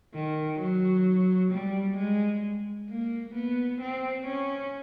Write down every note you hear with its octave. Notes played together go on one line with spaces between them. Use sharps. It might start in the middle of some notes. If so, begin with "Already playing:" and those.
D#3
F#3
G3
G#3
A#3
B3
C4
C#4